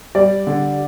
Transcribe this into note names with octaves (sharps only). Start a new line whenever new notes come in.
G3 D5
D3